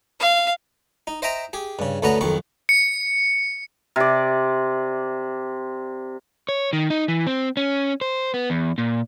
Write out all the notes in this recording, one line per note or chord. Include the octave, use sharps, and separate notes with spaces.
F5
D#4
C5 D#5 E5 G5 A#5
G4 G#4
G2 C#3
D2 D3 B3 C#4 F#5 A#5
B1 F2 D#3 C#6
C#7
C3 D5
C#5
D#3
D#4
E3
C4
C#4
C5
B3
E2
A#2